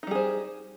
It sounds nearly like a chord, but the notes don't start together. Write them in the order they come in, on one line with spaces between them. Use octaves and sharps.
D#4 G3 G#4 C5